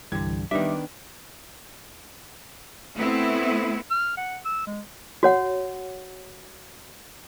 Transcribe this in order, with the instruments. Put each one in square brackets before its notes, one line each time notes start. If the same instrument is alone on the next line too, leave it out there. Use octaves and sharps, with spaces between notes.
[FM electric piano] C2 E3 [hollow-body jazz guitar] G2 D3 [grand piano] G#6
[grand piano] D#3 B3 D4 [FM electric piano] G3 D6 [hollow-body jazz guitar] D#4 E5
[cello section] A3 B3 C4 E4
[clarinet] F6
F#5
E6
G#3
[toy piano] F#4 C#5 F#5